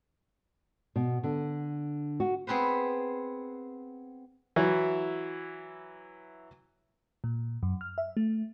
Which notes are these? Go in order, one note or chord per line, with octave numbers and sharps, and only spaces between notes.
B2
D3
F#4
B3 C4 G#4 B4 C5
E3 F#3 E4
A#2
F#2
F6
E5
A3